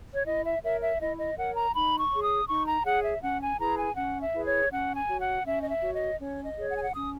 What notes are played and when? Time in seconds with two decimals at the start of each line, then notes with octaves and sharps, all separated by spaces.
0.14 C#5
0.25 E4 D#5
0.44 E5
0.63 A#4 C#5 E5
0.82 E5
1.00 E4 D#5
1.18 D#5
1.37 A#4 C#5 F#5
1.55 A#5
1.74 D#4 B5
1.99 C#6
2.11 G#4 C#5
2.24 D#6
2.49 D#4 C#6
2.67 A#5
2.85 G#4 C#5 F#5
3.04 E5
3.22 C#4 F#5
3.41 G#5
3.60 E4 G#4 B4 A#5
3.78 G#5
3.97 C#4 F#5
4.22 E5
4.34 E4 G#4 B4
4.46 C#5
4.71 C#4 F#5
4.96 G#5
5.08 F#4 C#5
5.21 F#5
5.45 C#4 E5
5.61 D#5
5.70 E5
5.82 F#4 C#5
5.95 D#5
6.19 C#4 C#5
6.44 D#5
6.57 G#4 C#5
6.69 F#5
6.76 G#5
6.83 F#5
6.93 C#4 D#6